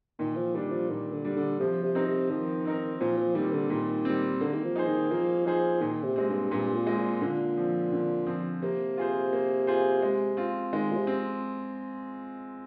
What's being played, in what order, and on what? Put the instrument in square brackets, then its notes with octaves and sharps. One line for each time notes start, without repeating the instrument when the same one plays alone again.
[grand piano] A#2 [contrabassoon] D#3
[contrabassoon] F3
[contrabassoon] D#3 [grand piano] G3 D4
[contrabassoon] F3
[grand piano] A#2 [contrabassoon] D#3
[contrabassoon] D3
[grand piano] G3 D4
[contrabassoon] D3
[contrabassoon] C3 [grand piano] F3
[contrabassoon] C3
[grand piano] C4 D#4 A#4
[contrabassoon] C3
[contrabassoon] D#3 [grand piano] F3
[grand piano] C4 D#4 A#4
[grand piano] A#2 [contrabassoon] F3
[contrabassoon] F3
[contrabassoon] D#3 [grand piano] G3 C4
[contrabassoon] D3
[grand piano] A#2 [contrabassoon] D#3
[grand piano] G3 C4
[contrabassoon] D3 [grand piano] A#3
[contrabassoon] D#3
F3
[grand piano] D#4 G#4 C5
[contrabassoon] D#3
[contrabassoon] F3 [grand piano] A#3
[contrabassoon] F3 [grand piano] D#4 G#4 C5
[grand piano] A#2 [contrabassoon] D#3
[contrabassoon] C3
[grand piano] G#3 C4
[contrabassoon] G2
[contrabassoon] G2 [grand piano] A#2
[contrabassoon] A#2
[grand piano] G#3 C4
[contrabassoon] A#2
[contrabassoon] A#2 [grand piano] D3
[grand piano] F3 C4
D3
F3 C4
[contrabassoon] C3 [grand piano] A#3
[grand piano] F4 G#4 C5
A#3
F4 G#4 C5
G#3
C4 F4
[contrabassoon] D#3 [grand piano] G#3
[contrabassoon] A#2
C3
[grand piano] C4